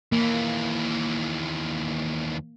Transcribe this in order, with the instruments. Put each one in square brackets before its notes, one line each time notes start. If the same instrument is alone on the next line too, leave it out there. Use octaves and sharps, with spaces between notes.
[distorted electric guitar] D#2 E3 [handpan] A#3